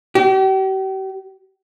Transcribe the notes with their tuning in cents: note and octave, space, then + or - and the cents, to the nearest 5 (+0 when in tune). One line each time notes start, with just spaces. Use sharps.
G4 -40